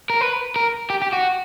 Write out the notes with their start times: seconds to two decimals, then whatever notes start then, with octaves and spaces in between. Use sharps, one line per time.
0.10 A#4
0.21 B4
0.56 A#4
0.90 G4
1.02 G4
1.13 F#4